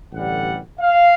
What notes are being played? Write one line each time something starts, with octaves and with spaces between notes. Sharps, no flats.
A1 G2 D3 G3 F#5
F5